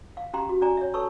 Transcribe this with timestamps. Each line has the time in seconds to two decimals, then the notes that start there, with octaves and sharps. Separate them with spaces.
0.17 F5
0.33 C#4 G4 F5 G5 A#5 C6
0.49 F#4
0.61 C#4 D5 G#5 A#5
0.77 C#5 E5
0.94 A4 B4 C#5 A5 C#6 E6